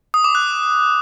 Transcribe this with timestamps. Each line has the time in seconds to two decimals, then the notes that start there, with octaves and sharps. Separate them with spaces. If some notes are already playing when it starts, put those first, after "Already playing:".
0.14 D#6
0.24 D6
0.35 F#6